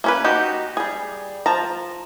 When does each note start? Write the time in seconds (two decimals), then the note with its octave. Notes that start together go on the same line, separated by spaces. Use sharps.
0.04 A#3 C#4 B4
0.24 D#4 F#4 G4
0.77 G3 G#4
1.46 F3 A5 A#5